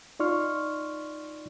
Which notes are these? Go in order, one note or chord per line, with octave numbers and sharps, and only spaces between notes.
D#4 F4 D5 C6 C#6 F6